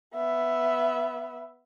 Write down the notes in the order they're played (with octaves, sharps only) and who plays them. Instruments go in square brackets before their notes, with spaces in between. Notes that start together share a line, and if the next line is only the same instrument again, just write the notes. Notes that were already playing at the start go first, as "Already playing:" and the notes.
[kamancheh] B3 E5